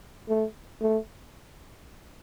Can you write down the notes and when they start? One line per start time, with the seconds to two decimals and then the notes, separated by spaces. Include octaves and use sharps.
0.29 A3
0.81 A3